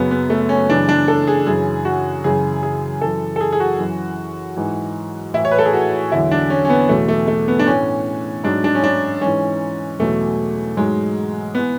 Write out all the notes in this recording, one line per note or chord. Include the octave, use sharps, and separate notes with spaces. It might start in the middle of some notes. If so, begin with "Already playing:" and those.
Already playing: F#2 C#3 F#3 B3
B3
A3
C#4
F#2 C#3 E3 D4
D4
A4
G#4
F#2 C#3 E3 G#4
F#4
F#2 C#3 E3 G#4
G#4
F#2 E3 A4
A4
G#4
G#4
F#4
F#2 E3
G#2 E3
A2 E3 E4
C#5
B4
A4
G#4
F#4
E2 D3 F#3 E4
D4
C#4
C#4
B3
E2 B2 F#3 A3
A3
A3
B3
D4
A2 E3 C#4
G#2 F#3 D4
D4
C#4
D4
G#2 E3 C#4
E2 B2 F#3 A3
G#2 F#3 G#3
E3 B3